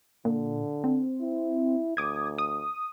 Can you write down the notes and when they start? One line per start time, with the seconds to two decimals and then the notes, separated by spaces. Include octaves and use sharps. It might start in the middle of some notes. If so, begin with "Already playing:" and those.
0.25 A#2 D3
0.84 C4
1.20 E4
1.97 D2 D6 D#6 G#6
2.38 D#6